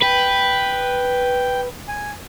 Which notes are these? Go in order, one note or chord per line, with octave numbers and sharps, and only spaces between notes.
B4 G5
G#5